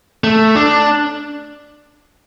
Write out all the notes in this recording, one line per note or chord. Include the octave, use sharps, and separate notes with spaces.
A3
D4